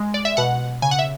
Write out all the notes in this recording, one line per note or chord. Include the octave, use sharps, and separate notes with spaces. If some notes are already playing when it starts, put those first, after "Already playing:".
Already playing: G#3
D5
E5
B2 F#5
C#3 G#5
F#5
E5